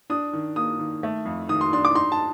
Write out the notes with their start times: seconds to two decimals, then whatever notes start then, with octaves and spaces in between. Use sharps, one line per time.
0.10 D4 D#6
0.33 D#3
0.56 A#3 D#6
0.79 D#3
1.03 A3
1.26 F2
1.49 D#3 D#6
1.61 C6
1.73 D4 C6
1.85 D6
1.95 D#4 C6
2.12 A5